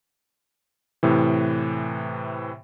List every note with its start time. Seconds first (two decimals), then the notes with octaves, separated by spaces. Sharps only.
1.03 A2 C3 E3